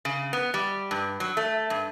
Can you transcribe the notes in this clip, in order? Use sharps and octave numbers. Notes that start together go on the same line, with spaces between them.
C#3
B3
G3
G2
F#3
A3
G2